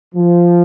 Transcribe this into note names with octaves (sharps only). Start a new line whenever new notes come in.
F3